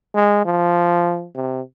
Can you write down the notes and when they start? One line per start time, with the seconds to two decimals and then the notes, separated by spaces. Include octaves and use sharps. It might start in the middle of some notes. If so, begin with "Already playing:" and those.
0.15 G#3
0.45 F3
1.35 C3